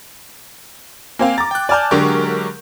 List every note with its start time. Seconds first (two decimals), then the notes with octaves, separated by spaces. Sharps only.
1.19 A#3 C4 F5 G#5
1.38 A#5 D6 A6
1.51 G5 F#6
1.69 D5 G#5 A5 F6 G6
1.91 D3 F#3 G#3 G4 A#4 C#6